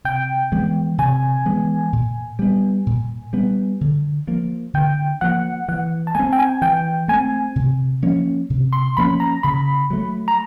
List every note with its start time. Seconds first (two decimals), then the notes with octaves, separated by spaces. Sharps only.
0.04 C3 G5
0.52 E3 G#3 B3
0.98 C3 G#5
1.45 E3 G#3 B3
1.93 A#2
2.39 G3 B3
2.87 A#2
3.33 G3 B3
3.81 D3
4.27 F3 A#3
4.74 D3 G5
5.21 F3 A#3 F#5
5.68 E3 F#5
6.07 A5
6.15 A3 G#5
6.19 C4
6.33 G5
6.39 G#5
6.62 E3 G5
7.08 A3 C4 G#5
7.56 C3
8.02 F3 A#3 C#4
8.50 C3
8.73 C6
8.97 F3 A#3 C#4 B5
9.20 A#5
9.43 C#3 B5
9.90 F#3 A3
10.28 A#5